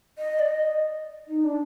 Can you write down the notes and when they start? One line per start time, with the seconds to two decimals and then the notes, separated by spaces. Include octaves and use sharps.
0.18 D#5
0.39 D5
0.46 D#5
1.28 D#4
1.44 D4